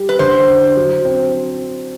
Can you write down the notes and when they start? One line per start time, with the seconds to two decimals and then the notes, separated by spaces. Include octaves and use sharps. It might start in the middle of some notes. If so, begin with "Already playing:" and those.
Already playing: G3
0.09 B4
0.19 D3 C5
0.48 D4
0.77 F#3
1.05 C4